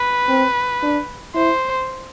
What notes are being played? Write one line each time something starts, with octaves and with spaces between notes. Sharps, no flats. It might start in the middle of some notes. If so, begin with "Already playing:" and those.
Already playing: B4
C4
D4
E4 C5